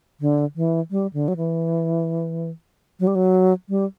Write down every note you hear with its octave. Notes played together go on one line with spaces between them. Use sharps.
D3
E3
G3
D3
F#3
E3
F#3
G3
F#3
G3